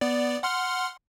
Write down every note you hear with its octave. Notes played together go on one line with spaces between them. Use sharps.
B3 D5
F#5 C6 F6